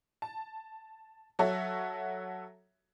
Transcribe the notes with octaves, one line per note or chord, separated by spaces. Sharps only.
A5
F#3 F#4 A4 C#5 E5